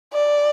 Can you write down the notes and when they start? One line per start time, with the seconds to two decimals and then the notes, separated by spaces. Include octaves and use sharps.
0.13 D5